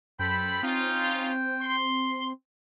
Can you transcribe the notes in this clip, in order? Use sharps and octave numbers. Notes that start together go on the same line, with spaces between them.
F#2 A4 C5 G5 B5
C4 C#4 D#4 F4
C6